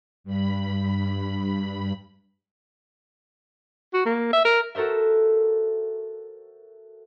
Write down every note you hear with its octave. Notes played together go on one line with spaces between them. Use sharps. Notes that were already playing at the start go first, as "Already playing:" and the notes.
G2 B5
F#4
A#3
E5
A#4
F#4 A4 A#4 C5 E5